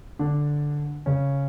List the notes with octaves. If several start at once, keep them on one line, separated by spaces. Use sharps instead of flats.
D3 D4
C#3 C#4